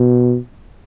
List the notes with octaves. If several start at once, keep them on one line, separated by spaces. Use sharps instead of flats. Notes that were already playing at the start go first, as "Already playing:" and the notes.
Already playing: B2